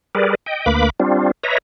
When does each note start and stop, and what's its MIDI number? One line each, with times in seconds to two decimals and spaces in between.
0.15 0.35 55
0.15 0.35 68
0.15 0.35 70
0.15 0.35 71
0.15 0.35 74
0.46 0.66 75
0.46 0.66 79
0.66 0.90 38
0.66 0.90 58
0.66 0.90 71
0.66 0.90 83
0.66 0.90 86
1.00 1.31 55
1.00 1.31 60
1.00 1.31 62
1.00 1.31 65
1.43 1.58 71
1.43 1.58 73
1.43 1.58 75
1.43 1.58 76
1.43 1.58 82